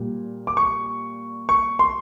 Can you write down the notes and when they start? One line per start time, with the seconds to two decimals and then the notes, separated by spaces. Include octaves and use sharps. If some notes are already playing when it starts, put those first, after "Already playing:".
Already playing: A#2 G3
0.47 D6
0.57 C#6
1.49 C#6
1.79 C6